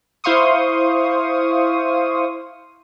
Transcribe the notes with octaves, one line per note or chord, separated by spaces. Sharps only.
E4 C5 F5 C6 C#6 D#6